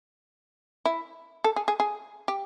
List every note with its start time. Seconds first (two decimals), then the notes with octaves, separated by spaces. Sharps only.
0.85 E4
1.44 A4
1.56 G#4
1.68 G#4
1.80 G#4
2.28 G4